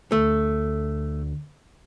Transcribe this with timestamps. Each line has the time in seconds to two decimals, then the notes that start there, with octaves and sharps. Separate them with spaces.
0.12 D2 A3